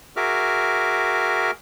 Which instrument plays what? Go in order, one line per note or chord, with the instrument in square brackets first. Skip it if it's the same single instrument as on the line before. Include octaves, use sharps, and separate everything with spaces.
[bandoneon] F#4 G#4 A#4 E5 D6 F6